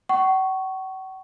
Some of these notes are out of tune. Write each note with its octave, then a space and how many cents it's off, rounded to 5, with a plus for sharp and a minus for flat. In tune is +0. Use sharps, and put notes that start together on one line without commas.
F#5 +45 C#6 +0